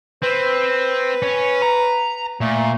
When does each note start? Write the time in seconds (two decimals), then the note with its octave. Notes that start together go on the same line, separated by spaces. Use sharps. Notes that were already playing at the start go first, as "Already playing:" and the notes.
0.23 C4 B4
1.22 C#4
1.62 A#5
2.41 A#2 A3